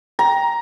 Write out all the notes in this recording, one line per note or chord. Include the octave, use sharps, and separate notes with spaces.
A#5